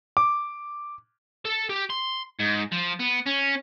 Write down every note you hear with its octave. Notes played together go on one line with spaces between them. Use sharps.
D6
A4
G4
C6
G#2
F3
B3
C#4